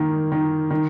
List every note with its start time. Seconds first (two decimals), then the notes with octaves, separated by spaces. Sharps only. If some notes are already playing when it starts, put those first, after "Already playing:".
Already playing: D#3 A#3
0.32 D#3
0.70 D#3